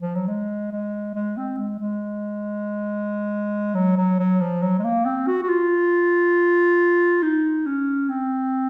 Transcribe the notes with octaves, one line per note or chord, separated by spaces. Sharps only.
F3
F#3
G#3
G#3
G#3
C4
G#3
G#3
F#3
F#3
F#3
F3
F#3
G#3
A#3
C4
F#4
F#4
F4
D#4
C#4
C4